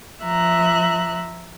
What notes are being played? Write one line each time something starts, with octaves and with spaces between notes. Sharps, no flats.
F3 E5 A#5 F#6